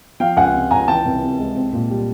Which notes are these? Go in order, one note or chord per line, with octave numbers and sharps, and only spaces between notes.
F3 F5 G5
C#2 F#5 G#5
C3
C#2 G#5 A#5
E3 G5 A5
C2
C3
G#3
C4
A#2
G3